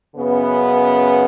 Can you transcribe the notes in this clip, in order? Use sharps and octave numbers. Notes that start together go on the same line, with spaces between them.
F#2 C#3 B3